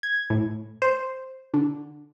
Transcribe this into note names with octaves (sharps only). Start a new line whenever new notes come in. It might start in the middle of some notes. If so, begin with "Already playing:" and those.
G#6
A2
C5
D3